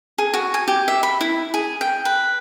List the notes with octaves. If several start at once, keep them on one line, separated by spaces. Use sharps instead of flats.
G#4
F#4
G#5
G4
E5
B5
E4
G#4
G5
B4